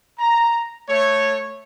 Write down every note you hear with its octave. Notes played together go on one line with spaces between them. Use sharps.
A#5
A3 C#5